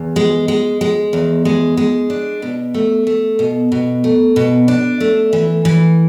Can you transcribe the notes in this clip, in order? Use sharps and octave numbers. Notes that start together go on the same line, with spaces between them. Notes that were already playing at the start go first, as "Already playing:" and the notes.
Already playing: E2
G#3
G#3
G#3
E2
G#3
G#3
D4
B2
A3
A3
B2
B2
A3
B2
D4
A3
E3
E3